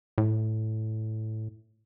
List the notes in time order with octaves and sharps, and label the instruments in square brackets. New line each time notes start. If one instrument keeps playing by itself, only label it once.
[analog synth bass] A2